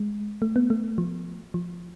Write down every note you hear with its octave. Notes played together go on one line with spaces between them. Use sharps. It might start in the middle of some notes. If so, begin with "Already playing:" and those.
Already playing: G#3
A3
B3
A3
F3
F3